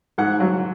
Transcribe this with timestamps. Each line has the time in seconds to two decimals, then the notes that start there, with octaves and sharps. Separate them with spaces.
0.18 G#2 F#5
0.40 F#3